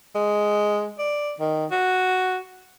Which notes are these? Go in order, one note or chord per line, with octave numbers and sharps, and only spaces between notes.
G#3
D5
D#3
F#4